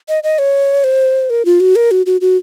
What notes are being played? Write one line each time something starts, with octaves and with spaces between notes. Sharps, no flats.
D#5
D#5
C#5
C5
A#4
F4
F#4
A#4
F#4
F#4
F#4